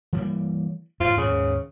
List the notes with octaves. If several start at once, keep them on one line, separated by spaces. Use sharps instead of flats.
E3 G3 A#3
E2 G#2 F4
D#2 G#2 C#3